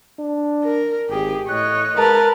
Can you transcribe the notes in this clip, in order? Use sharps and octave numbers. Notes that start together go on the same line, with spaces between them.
D4
A#4
G#1 G4 G#4
A2 C#5 D#5 F#6
G#3 A#4 B4 A5